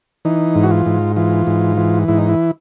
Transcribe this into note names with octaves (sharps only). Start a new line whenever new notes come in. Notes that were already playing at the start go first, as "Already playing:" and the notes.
E3 D#4
G#2
F#4
F4
G#2
E3 F4
G#2
E3
G#2 E4
D#4
E4